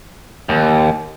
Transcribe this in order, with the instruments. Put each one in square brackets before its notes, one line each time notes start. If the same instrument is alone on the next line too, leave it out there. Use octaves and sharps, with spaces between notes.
[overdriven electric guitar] D#2